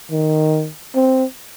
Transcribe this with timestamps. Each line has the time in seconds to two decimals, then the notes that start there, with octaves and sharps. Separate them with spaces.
0.11 D#3
0.95 C4